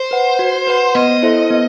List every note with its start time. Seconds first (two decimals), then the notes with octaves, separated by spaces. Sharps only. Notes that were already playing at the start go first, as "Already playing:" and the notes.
Already playing: C5
0.11 B4 F#5
0.39 F#4
0.67 B4 F#5
0.95 B3 D#5
1.23 E4 A4 C5 E5
1.50 B3